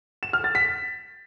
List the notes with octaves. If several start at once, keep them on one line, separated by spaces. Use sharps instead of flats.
E7
F6
A6
B6